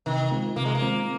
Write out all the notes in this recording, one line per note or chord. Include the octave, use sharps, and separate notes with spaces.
C3 D#3
D#3 G#3 C4 F4
C3 A#3
G#3
A#3
D#3 G#3 C4 F4